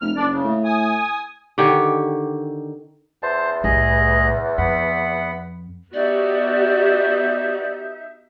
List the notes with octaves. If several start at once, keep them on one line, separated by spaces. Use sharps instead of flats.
F1 F6
F#1 D4 D5
C#3
A2
G#5 D#6
D3 D#3 G4 C#5
E2 C5 A5
C2 A2 G#4 D#5
F2 B3 F#5 B5
B3 D#4 F#4 G4 D5 E5 G6